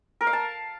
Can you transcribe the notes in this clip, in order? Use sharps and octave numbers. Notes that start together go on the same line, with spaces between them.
A#4
F5
A5